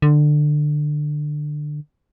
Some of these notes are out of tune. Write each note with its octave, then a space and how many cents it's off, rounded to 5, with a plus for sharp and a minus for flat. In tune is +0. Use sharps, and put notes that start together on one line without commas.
D3 +20